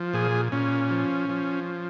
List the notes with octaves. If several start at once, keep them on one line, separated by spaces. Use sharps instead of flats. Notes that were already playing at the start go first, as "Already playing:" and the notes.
Already playing: F3
A#2 G#4
A#2 C#4
F3
F3